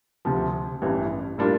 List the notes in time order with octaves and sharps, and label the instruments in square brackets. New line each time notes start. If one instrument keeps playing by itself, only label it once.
[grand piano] D2 C3 F3
A1 G2 E3
A2 G3 A#3 D4 F4